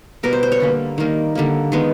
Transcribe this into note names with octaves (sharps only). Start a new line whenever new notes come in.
B2 G3 B3 A#4
C5
C5
C#5
D3 G3 A#3
D#3 G3 A#3
D3 G3 A#3
D#3 G#3 B3